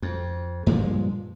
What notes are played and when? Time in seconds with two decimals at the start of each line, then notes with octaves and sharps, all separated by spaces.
0.02 F2
0.66 G2 A#2 F3 G#3